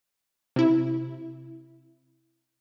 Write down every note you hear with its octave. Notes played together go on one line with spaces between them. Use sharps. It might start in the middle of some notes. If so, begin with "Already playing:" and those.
C3 E4